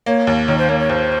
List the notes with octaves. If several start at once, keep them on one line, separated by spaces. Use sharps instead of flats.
A#3 C#5
D#2
D#3 C#5
C5
A#3 C#5
C#5
D#2 C5